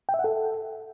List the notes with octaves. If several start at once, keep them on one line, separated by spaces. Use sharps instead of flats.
G5
E5
F#5
A4